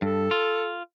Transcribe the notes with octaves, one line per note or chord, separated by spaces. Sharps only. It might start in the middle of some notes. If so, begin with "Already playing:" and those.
G2 A4
F4